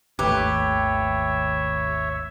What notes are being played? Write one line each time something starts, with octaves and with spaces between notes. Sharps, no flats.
G#1 D#2 A3 G4 B4 C#5 E5